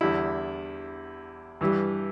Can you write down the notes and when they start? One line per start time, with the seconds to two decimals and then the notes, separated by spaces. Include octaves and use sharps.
0.01 E2 D3 G3 E4
1.61 G2 E3 G3